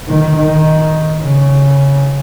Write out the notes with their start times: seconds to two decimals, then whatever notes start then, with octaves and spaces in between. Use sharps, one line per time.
0.08 D#3
0.36 D#3
1.21 C#3